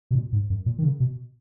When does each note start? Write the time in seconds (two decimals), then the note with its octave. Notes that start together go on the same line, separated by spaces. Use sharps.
0.11 B2
0.15 A#2
0.32 G#2
0.50 F#2
0.66 A#2
0.78 D#3
0.84 C#3
1.00 B2